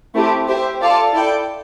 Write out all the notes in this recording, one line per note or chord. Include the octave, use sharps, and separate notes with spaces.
A3 C4 E4 G4
G4 C5 E5
F4 A4 D5 F5 A5
E4 A4 D5 G5